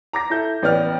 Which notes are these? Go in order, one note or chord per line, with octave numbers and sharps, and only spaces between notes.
A#5 D6 A#6
E4 A4 G6
A1 B3 D5 F6